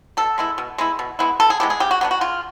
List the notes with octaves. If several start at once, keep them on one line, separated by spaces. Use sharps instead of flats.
B2 A4
G#3 B3 E4
B2
G#3 B3 E4
B2
G#3 B3 E4
B2 A4
G#4
G#3 B3 E4 G4
G#4
C#3 G4
F#4
F#3 B3 D4 G4
F#4
C#3 F4